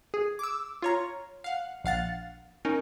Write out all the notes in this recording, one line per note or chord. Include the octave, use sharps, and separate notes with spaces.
G#4
D6 E6
F4 C#5 A#5
F5 F#5
A#1 F5 F#5 A6
C#4 D#4 A#4